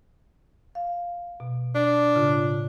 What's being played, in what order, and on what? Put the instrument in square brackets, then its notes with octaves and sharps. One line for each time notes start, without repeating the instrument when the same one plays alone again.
[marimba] F5
B2
[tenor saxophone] D4
[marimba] A2 C#3 F4